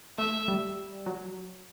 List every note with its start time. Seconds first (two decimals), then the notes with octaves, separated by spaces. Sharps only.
0.18 A3 E5
0.48 G3
1.06 F#3